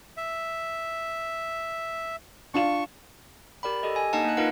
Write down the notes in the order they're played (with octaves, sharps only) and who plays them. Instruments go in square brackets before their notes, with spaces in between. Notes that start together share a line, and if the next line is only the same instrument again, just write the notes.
[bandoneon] E5
[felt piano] D4 F4 E7 [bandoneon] C#6
[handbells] G4 A#4 D5 G5 B5
G4 A4 D#5
G#5
A#3 D4 D#4 D#5 F#5 A5
A#3 F#6
D#4 F4 A#4 B4 F5 F#5